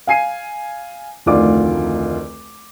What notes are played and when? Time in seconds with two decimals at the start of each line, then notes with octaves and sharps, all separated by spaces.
0.07 F5 G#5 C7 D#7
1.26 F1 D2 D#3 F4 D5 D6